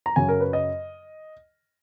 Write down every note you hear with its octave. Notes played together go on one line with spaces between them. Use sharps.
A#5
F#2 C#3 F#3 G#5
A#4
B4
D#5